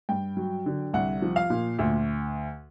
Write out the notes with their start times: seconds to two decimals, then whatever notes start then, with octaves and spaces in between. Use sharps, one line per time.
0.09 G2 G5
0.37 F#3
0.66 D3
0.93 C2 F#5
1.22 F3
1.36 F5
1.50 A#2
1.79 D2